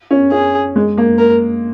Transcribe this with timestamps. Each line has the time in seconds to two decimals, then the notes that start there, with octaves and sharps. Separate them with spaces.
0.11 C#4
0.32 C#4 G#4
0.76 G#3
0.98 A#3
1.19 A#4